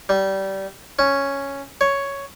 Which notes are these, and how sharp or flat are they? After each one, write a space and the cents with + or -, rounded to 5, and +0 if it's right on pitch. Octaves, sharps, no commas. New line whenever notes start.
G3 -20
C#4 +0
C#5 +5